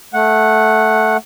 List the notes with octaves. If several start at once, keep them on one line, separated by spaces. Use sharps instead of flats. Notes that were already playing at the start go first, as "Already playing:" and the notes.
A3 F#5